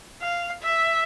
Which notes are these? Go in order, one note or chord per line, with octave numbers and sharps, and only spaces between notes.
F5
E5